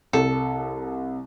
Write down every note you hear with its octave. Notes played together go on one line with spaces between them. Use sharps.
C2 A4